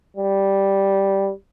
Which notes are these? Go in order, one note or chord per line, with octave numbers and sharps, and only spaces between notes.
G3